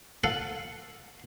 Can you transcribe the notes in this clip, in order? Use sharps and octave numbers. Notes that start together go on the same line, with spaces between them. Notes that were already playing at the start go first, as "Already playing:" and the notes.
A4 F5 F#5